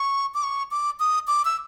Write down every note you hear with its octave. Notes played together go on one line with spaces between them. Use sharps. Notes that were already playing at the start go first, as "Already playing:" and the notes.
Already playing: C#6
D6
C#6
D6
D#6
D6
E6